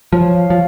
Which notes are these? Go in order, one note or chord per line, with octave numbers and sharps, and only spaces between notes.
F3 C#5
F5
F3